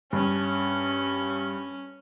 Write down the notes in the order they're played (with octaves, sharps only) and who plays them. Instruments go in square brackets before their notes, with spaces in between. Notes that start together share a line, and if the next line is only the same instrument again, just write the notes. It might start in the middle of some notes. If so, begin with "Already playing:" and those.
[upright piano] G2 [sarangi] C#4